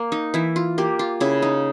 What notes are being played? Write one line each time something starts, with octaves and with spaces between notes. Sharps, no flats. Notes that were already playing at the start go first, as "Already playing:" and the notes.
Already playing: A#3
D#4
E3 E4
F4
A#3 G4
F4
C#3 E4
D#4